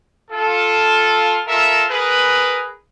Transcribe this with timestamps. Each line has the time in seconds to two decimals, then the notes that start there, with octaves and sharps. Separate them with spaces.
0.31 F4 A4
1.47 F4 A4 A#4 E5
1.89 G#4 A#4 B4